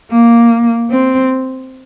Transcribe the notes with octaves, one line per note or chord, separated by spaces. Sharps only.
A#3
C4